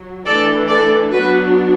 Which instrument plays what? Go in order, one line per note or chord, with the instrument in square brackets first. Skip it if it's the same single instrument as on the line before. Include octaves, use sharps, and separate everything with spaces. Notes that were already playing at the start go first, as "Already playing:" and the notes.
Already playing: [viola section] F#3
E3 A3 D4 A4 D5
A4 D5
F#3 B3 D4 F#4 B4